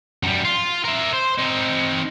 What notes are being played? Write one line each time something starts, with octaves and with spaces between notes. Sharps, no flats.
F#2 G3
F4
A#4 E5
C5
C4 D#4